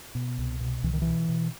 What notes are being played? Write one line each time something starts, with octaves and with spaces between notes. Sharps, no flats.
B2
C2
B2
C2 E3
D#3
B2 E3
B2